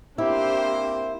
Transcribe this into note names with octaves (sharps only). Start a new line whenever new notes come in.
A#3 C4 D4 E4 G4 C5